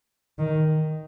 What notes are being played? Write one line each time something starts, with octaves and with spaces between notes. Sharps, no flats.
D#3